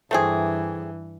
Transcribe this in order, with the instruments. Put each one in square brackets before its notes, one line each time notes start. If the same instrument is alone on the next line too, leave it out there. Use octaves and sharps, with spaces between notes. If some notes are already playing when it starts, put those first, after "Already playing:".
[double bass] G2 E3 [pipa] A3 C4 G#4